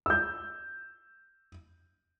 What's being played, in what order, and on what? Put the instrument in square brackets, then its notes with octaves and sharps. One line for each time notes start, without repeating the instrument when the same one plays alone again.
[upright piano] E6 G6